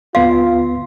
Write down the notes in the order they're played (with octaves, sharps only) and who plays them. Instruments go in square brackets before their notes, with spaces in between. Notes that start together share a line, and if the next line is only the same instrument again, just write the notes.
[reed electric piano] D2 B3 C6 [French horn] F4 [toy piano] F5